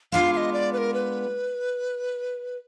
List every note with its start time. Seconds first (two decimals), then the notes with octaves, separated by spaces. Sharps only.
0.12 G#3 B3 D4 F4 F5
0.33 F5
0.37 D#5
0.53 D5
0.73 B4
0.78 A#4
0.94 B4